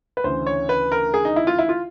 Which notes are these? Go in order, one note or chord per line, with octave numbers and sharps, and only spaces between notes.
B4
D2 C#3 E3 C5
C#5
B4
A#4
G#4
D#4
E4
F4
E4
F4